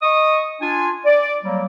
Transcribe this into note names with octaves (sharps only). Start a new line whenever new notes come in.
D#5 C#6 D#6
D4 F4 G#5
D5
F#3 G3 A#3